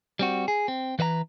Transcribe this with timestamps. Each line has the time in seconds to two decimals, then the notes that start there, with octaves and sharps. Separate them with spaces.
0.19 G3 C4 F#4
0.48 G#4
0.68 C4
0.99 E3 B4 D#5 A#5